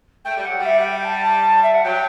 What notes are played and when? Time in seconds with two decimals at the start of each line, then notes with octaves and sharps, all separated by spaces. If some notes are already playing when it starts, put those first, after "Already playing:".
0.25 A3 G5
0.37 G3
0.45 F#3 F#5
0.59 G3
0.65 E5
0.79 F#5
0.85 G5
1.05 A5
1.63 E5
1.74 F#5
1.84 F#3 G5